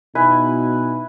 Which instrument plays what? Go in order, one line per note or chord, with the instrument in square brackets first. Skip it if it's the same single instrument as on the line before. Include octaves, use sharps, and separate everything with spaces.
[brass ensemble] B2 D#4 [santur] E4 B4 G#5